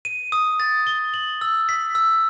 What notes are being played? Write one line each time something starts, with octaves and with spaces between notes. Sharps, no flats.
D#7
D#6
A6
G7
F#7
E6
B6
E6